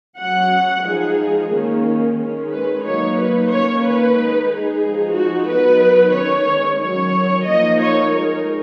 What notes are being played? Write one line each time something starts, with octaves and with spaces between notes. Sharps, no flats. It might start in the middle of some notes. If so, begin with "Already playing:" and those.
F#3 C#4 F#5
F3 G#3 D#4 G#4
D#3 A#3 C#4
D#3 G#3 C#4
B4
F#3 A#3 D#4 C#5
B4
D#3 A#3 C#4 C#5
B4
G#3 D#4
G#4
F3 G#3 D#4
F#4
F#3 B3 D#4 B4
D#3 G#3 C#4 C#5
D#3 F#3 C#4 C#5
F3 A#3 D#4 D#5
C#5
G#3 D#4 A#4